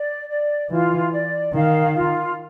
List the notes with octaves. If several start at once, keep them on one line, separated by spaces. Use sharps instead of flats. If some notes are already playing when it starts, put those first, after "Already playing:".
Already playing: D5
D5
E3 F4
D5
D#3 F5
F4